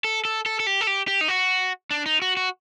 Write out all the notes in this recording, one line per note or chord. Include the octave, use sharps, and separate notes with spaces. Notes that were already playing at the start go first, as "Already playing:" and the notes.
A4
A4
A4
A4
G4
A4
G4
G4
D#4
F#4
D4
D#4
F#4
F#4